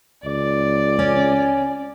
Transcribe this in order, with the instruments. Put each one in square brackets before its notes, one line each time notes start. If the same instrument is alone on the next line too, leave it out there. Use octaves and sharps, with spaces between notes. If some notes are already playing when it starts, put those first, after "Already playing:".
[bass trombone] C#2 [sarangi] D5
[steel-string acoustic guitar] C#4